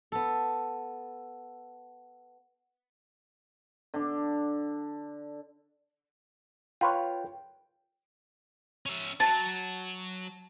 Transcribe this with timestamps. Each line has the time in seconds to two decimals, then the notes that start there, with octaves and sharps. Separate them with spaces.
0.12 B3 A4
3.94 D3 D4
6.81 F4 B4 C#5 G5
8.86 C#4 E5
9.20 F#3 A5